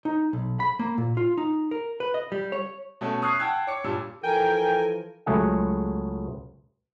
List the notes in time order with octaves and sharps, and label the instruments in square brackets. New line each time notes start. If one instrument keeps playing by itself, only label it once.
[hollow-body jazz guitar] D#4
B1
B5
A#3
A#2
F4
D#4
A#4
B4
D#5
G3
C#5
[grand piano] B2 A3 C#4 A4
C#6 D#6 F6 F#6 G#6 C7
F#5 G5 A5 E6 F#6 G#6
C#5 D6 C#7
G2 A#2 G3 E6
[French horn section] E3 F3 A4 [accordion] A#4 G#5 [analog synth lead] G5
[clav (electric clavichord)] C#2 F#3 A3 G#4 F#5